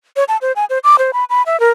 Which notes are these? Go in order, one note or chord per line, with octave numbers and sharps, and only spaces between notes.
C#5
A5
C5
G#5
C5
D6
C5
B5
B5
E5
A#4